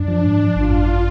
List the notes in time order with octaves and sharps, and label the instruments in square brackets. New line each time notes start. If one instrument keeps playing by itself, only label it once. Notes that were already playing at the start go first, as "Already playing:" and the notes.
Already playing: [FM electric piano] F#2 [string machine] D4
[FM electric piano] F3
G#2
F3
[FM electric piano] G#1 [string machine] F4
[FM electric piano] F#2